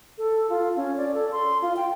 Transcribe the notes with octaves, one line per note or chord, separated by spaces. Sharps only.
A4
F4
C#4
D5
A4
C6
F4
G5